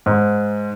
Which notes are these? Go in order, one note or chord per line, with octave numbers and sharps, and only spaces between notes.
G#2